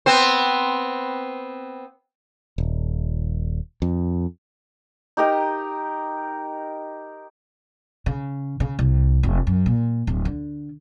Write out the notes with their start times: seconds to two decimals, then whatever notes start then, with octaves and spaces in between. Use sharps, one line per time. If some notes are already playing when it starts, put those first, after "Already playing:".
0.06 B3 C4 C5
2.58 D#1
3.82 F2
5.17 D#4 G4 A#4 D#5
8.06 C#3
8.60 C#3
8.79 C2
9.23 F1
9.47 F#2
9.66 A#2
10.07 D1
10.25 D3